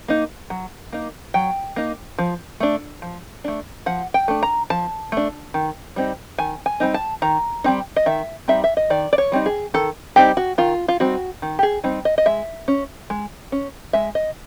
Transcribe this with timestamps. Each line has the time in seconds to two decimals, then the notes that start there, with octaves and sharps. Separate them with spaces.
0.08 A#3 D#4
0.50 F#3
0.93 A#3 D#4
1.34 F#3 G5
1.76 A#3 D#4
2.18 F3
2.60 A3 D4
3.02 F3
3.44 A3 D4
3.86 F3 F#5
4.14 G5
4.28 A3 D4
4.43 A#5
4.70 F3 A5
5.12 A3 D4
5.54 D#3
5.96 G3 C4 D#4
6.38 D#3 G#5
6.66 G#5
6.80 G3 C4 D#4
6.94 A5
7.22 D#3 A#5
7.64 G3 C4 D#4
7.96 D#5
8.06 D#3 E5
8.48 G3 C4 D#4 E5
8.64 E5
8.77 D#5
8.90 D#3 D5
9.13 D5
9.18 C#5
9.32 G3 C4 D#4
9.46 G#4
9.74 D#3 A4
10.16 G3 C4 D#4 G4
10.37 F#4
10.58 D#3 F4
10.88 F4
11.00 G3 C4 D#4 F#4
11.42 D#3
11.59 G4
11.63 G#4
11.84 G3 C4 D#4
12.05 D#5
12.18 D#5
12.26 G#3 E5
12.68 C#4
13.10 G#3
13.52 C#4
13.93 G#3 E5
14.15 D#5